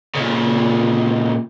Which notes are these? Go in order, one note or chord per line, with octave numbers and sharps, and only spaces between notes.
A#2 C#3